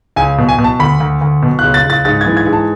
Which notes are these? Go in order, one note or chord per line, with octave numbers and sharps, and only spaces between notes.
C#2 G#5
B2
G#5
B2
A5
D2 B5
D2
D2
B2
F#6
C#2
A6
C#2
A6
G#2 A6
G#6
E3
G#6
G#2
A5